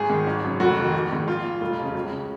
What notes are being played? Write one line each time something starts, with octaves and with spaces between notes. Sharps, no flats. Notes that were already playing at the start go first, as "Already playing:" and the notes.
Already playing: G#1 G#4
G#2 D#3
G#1
F#2 C#3
F1 F#4
F2 D#3
A#1
G#2 D#3
A#1 F4
A#2
F1 F4
F2 C#3
C#2
C#3